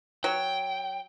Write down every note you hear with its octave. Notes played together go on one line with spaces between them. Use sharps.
F#3 G5